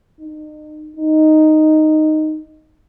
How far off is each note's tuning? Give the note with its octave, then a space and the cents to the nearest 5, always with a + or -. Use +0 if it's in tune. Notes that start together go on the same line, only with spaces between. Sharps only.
D#4 -35
D#4 -5